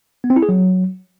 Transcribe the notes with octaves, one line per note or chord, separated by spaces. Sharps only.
B3
C4
E4
G#4
F#3